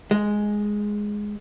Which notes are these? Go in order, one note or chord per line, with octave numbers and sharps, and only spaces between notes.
G#3